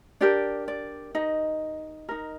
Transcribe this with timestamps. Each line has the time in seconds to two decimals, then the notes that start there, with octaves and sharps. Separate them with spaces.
0.21 D4 G4 A#4 D5
0.68 D5
1.15 D#4 D#5
2.09 D#4 A#4